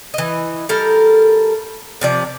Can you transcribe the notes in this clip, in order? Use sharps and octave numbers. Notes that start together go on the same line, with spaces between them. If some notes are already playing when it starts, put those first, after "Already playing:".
E3 D#5
G3 A4 A#4
C3 F3 D5